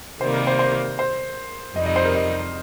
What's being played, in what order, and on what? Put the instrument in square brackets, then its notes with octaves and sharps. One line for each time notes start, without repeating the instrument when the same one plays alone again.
[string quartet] C3 D#3 G3 A#3 [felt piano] C5
[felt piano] A#4
C5
C5
C5
[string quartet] F2 C3 G3 D#4 [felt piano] D#5
[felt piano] D#5
C5
A#4
D#5